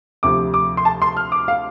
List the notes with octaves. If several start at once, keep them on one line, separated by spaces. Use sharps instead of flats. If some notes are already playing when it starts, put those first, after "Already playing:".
D2 C3 F3 D6
D6
C6
A5
C6
F6
D6
F5